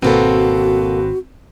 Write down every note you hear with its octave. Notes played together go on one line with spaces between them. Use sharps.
G#1 B2 A#3 C4 F#4 A4 B4